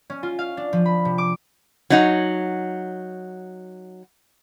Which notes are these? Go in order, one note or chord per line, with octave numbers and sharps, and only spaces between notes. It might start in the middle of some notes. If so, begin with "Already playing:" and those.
C#4
F4
F5
D4
F3
B5
C3
D6
F#3 D#4 F#5